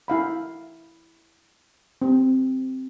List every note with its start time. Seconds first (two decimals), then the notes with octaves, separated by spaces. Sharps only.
0.08 E4 F5 B5
2.02 C4